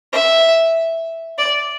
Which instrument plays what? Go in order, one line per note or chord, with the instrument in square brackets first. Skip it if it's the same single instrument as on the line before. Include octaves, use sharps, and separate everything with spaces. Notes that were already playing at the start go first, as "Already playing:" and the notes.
[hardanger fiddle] E5
D5